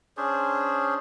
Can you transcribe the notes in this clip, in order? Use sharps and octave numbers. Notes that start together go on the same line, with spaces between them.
C#4 D4 G#4 C5